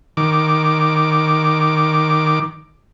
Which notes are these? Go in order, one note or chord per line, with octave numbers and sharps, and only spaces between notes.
D#3 D6